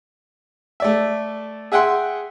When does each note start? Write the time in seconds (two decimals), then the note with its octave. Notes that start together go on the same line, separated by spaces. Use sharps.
0.80 A3 D5 E5
1.72 G#4 E5 F#5 G5 C6